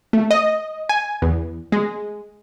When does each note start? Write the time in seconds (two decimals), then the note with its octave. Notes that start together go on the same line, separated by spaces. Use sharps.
0.13 A3
0.31 D#5
0.89 G#5
1.22 E2
1.72 G#3